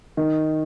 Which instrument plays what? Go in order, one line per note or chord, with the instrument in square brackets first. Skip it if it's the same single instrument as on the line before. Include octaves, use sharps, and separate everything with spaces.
[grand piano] D#3